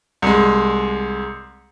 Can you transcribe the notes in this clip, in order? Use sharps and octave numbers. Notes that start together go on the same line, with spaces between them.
C2 G#3